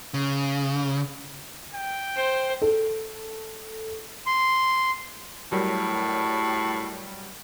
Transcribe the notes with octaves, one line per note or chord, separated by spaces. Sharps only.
C#3
G5
C5
A4
C6
A2 F#3 G3 A#4